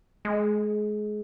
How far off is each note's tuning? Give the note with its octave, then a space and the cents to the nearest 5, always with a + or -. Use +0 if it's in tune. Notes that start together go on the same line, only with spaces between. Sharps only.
G#3 +25